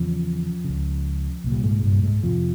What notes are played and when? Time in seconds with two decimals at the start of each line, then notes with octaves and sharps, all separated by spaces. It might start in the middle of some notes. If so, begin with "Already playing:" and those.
Already playing: E2 C#3 F3
0.64 C#2 C#3
1.44 C2 A#2
1.52 G3
1.63 G#2 G#3
1.83 G2 G3
2.03 G#2 G#3
2.23 F2 C3 F3